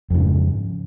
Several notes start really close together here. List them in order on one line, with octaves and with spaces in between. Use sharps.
F2 C#3 G#2